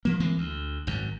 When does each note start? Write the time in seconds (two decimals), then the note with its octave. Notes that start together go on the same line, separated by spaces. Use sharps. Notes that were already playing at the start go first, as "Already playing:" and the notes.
0.05 F3 A#3
0.20 E3 G#3 A#3 C4
0.38 D2
0.87 G#1 F#2